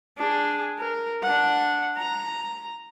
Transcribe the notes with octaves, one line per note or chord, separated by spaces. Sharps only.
D4 G#4
A#4
D4 F#5
A#5